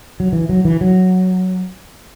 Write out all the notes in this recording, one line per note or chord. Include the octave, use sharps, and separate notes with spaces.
F#3
E3
F#3
E3
F#3